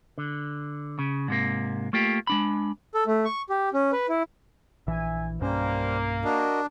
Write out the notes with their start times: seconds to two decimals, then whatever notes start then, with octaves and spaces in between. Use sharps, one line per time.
0.18 D3
0.99 C#3
1.28 G#2 C3 A#3
1.93 A3 A#3 F4 G4
2.27 G#3 D4 B5
2.95 A4
3.07 A3
3.25 C#6
3.50 G4
3.73 C#4
3.92 B4
4.09 E4
4.87 A#1 E3 E5 G#5
5.41 B1 G2 G3 A#3 C#4 C5
6.24 D4 F#4 A#4 D#5